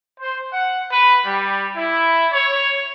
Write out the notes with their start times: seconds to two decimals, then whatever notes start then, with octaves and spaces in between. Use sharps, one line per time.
0.20 C5
0.52 F#5
0.92 B4
1.26 G3
1.76 E4
2.33 C#5